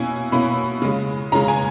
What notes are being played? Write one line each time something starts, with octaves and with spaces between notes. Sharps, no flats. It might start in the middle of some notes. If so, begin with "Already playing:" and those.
Already playing: B2 A#3 C#4 E4 G#5
B2 A#3 C#4 E4 B5
C#3 G#3 C#4
C#3 G#3 C#4 A#5
G#5